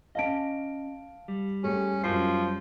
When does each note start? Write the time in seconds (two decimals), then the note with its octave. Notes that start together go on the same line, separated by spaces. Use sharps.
0.15 C#4 D#5 F5 A5 D7
1.28 G3
1.64 A3 C#4 G4 G#4
2.04 F#2 F3 C7